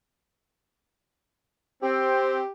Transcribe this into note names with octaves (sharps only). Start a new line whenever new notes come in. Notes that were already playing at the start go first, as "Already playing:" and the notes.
C4 G4